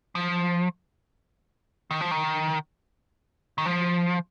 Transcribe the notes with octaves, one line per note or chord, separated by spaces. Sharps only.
F3
D#3
F3
D#3
D#3
F3